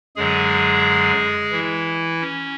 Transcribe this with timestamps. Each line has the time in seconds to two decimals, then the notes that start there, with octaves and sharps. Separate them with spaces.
0.16 F#2 D3 F#3 G#3 G#4
1.52 E3 E4
2.21 C#4